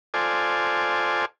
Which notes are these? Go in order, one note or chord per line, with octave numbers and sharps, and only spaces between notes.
F4 A4 C5 D5 G#5